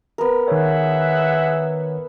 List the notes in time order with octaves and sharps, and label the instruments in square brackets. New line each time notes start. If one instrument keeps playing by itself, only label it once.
[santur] B3 A#4
[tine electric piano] D#3 C#5 [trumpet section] G#4 E5 F#5